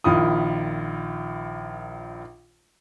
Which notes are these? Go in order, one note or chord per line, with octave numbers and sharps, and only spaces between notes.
A#1 D#3 E4 F4 D#6